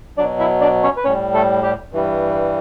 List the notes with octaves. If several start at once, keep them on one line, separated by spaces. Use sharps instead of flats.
B2 F#3 D4 D5
E4 E5
D4 D5
C#4 C#5
B4
A2 G3 C#4 C#5
A3 A4
G3 G4
G2 E3 G3